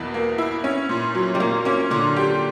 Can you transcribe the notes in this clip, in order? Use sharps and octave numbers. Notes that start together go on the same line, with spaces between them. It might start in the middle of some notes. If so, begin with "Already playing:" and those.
Already playing: E2 B2 A#3 B3 E4
A#3
E4
C#4
A#2
F#3
G3
A#2 A#3
A#3 C#4
A#2 D3
G4